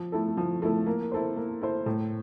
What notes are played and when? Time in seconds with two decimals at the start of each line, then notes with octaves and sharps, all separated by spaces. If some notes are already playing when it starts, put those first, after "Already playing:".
Already playing: F3
0.12 A3 E4 A4
0.37 F3
0.62 A3 E4 A4
0.86 A#3
1.12 E4 A4 C5
1.36 A#3
1.62 E4 A4 C5
1.86 A2